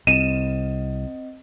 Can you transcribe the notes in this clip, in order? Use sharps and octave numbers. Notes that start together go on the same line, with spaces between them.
C2 C4 D#5 D#7 E7